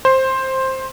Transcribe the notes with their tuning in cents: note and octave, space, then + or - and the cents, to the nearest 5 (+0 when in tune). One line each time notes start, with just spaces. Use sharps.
C5 +10